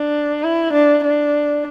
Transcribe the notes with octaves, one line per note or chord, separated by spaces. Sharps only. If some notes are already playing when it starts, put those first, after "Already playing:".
Already playing: D4
E4
D4
D4